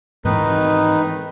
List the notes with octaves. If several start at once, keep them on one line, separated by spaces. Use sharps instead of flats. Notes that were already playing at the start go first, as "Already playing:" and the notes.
G#2 D#3 E3 C4 D#4 B4